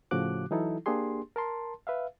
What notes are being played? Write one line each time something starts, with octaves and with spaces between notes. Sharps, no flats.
A2 C#3 F3 F#4 D6 F#6
E3 F#3 D#4 E4 A4
A#3 D4 G4 G#4 C6
A#4 A5 C6
B4 E5 F5